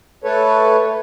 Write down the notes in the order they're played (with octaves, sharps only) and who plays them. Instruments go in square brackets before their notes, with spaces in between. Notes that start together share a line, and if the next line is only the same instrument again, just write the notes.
[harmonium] A3 A4 B4 C#5